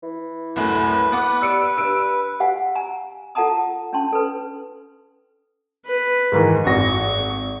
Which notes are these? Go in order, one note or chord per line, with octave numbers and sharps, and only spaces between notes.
E3
C2 F#2 A2 B4
B3 F#5 D6
G3 E6 C#7 D7
G2 E6 D7
G4 F5 F#5 G#5
G#5 A#5
F4 A4 F#5 A5 A#5 D#6
C#4 D4 A5 C6
A4 B4
B4
G#2 D#3 E3
G#1 F#4 C#6 A#6